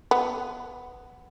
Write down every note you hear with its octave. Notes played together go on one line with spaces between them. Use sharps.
B3